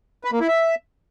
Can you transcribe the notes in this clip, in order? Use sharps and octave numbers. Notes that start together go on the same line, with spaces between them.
B4
A#3
E4
E5